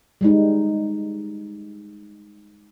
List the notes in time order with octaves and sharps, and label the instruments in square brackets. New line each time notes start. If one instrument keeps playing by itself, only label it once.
[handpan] G3 G#3 D#4